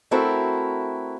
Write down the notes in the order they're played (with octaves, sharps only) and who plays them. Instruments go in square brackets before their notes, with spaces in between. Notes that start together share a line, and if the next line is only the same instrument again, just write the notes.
[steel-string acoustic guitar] A3 C4 E4 F#4 A4 A#4